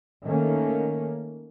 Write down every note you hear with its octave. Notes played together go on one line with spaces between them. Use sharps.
D#3 A3 A#3 C#4